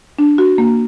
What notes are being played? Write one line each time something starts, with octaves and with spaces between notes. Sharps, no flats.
D4
F#4
A#3